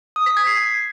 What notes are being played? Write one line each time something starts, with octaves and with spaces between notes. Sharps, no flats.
D#6
B6
G#6
C7